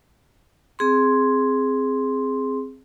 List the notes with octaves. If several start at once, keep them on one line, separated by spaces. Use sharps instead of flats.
C4 G#4 C6